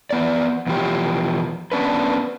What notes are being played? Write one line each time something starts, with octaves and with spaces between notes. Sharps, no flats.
E3 B3 D5
E2 B2 E3 F3 G4
B3 C#4 D4 B4